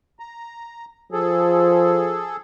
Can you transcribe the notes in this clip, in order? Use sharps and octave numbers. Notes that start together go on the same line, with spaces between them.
A#5
F3 G#4 A4